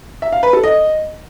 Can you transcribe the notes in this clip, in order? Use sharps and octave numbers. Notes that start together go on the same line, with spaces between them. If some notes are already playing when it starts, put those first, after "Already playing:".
E5
F5
B4
A4
D#5